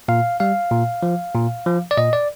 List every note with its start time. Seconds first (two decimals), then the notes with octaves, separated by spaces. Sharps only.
0.08 A#2 F5
0.40 G3 F5
0.71 A#2
1.03 F3
1.35 A#2
1.66 F3
1.91 D5
1.97 A#2 D#5
2.13 D5